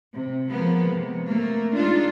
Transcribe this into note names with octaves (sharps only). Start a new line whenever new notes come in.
C3
F3 G#3 A#3 B3
C3
A3 A#3
G#3 D4 D#4 F4